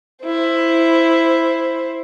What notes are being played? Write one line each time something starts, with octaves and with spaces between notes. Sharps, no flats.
E4 C5